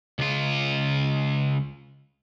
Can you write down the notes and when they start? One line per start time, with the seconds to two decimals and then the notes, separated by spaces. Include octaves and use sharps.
0.19 C#2 F4